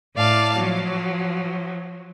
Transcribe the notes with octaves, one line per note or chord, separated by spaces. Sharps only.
A2 D5 F5 A5
F3 F#3